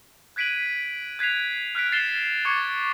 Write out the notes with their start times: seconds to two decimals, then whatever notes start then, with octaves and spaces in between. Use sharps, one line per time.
0.36 F#6 G#6 B6 D7 D#7 F#7
1.19 F#6 G#6 B6 C7 F7
1.75 F6 F#6 B6 D7
1.92 A6 C7 C#7 E7 G7
2.45 C#6 D6 G#6 A6 C#7